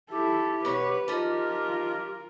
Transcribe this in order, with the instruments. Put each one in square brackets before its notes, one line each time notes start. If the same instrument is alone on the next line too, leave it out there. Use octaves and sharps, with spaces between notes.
[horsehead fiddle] E4 A4 [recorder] G4
[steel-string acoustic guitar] B2 C#5 [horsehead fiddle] B4
[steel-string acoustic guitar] F3 D#4 [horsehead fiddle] F4 A#4